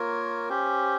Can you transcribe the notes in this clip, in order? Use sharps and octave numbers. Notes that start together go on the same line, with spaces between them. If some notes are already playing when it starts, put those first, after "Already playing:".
Already playing: A#3 F4 A#4 C#5
C#4 G4 C5